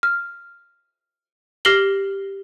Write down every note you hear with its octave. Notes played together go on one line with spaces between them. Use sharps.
F6
G4 F6 A#6 C7 F#7 G7